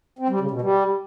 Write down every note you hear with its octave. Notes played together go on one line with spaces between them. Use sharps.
C4
G3
C#3
B2
G3